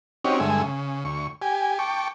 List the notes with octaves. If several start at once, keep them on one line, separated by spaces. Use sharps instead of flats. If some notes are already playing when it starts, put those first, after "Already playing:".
C4 C#4 D#4 F#4 G4 C#5
G2 D3 G#3 A4 E5 G#5
C#3
D2 C#6
G4 G#5
G5 A5 C#6 D6